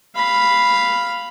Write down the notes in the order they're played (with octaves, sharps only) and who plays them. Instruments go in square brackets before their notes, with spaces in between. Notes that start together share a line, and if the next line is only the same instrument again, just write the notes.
[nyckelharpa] F5 B5